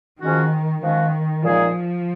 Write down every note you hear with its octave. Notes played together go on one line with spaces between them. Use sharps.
D#3 F3 G#3 C#4 F#4
D#3 F3 G#3 C#4 F#4
A#2 F3 G#3 D#4 G#4